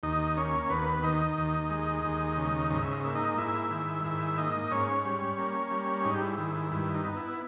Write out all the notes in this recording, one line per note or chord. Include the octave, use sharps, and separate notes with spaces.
D#2 D#4 D#5
A#3 C#4 C#5
D#2 B3 B4
D#3 D#4 D#5
D#2
G#3
D#2
C#3
G#2 D#5
E5
D#5
A#3 E5
D#4 D#5
G#2 E4 E5
D#3
G#2 E4 E5
A#3 D#4 D#5
G#2 C#4 C#5
G3
A#3
G3
G#2 D#4
G4
E4
D#3 E4
E4
G2 E4
D#4
B3
E4